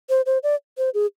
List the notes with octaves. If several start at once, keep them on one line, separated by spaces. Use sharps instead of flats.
C5
C5
D5
C5
G#4